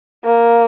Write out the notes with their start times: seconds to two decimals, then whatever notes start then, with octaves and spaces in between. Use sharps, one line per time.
0.25 A#3